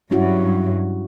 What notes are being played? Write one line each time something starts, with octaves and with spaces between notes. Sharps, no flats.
G2 F#3 C#4 E4 F#4